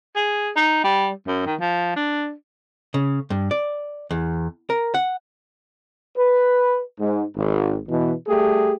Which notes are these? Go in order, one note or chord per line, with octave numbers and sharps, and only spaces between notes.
G#4
D#4
G3
F#2
D#3
F3
D4
C#3
G2
D5
E2
A#4
F#5
B4
G#2
G#1
B2 E3
G3 A3 G4 G#4